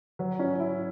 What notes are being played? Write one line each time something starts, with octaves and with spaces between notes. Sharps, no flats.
F#3
C#4
E4